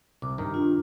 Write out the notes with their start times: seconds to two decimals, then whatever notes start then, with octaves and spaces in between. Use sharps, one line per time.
0.22 C2 D6
0.38 G2 D#3 A#5
0.54 D4 F4